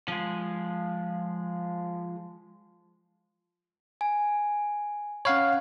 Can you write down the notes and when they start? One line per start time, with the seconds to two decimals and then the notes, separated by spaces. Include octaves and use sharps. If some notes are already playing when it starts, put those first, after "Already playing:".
0.08 F3 G#3
4.01 G#5
5.25 C#4 C#5 F5 F#5 B5